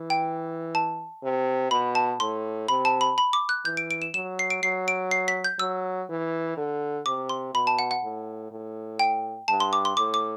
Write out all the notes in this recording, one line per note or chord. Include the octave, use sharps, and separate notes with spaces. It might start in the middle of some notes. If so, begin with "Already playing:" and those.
Already playing: E3
G5
A5
C3
B2 B5
A5
A2 C6
C3 B5
A5
B5
B5
D6
F#6
E3 G6
D7
D7
E7
F#3 E7
C7
D7
F#3 C7
D7
C7
B6
G6
F#3 E6
E3
D3
C3 D6
C6
B2 B5
A5
F#5
F#5
A2
A2
G5
G2 A5
C6
D6
C6
A2 D6
D6